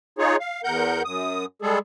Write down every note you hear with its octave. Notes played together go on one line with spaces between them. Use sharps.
D#4 F4 G#4 C#5
F5
E2 A#4 F#5 G6
F#2 D#6
G3 G#3 G#4 A4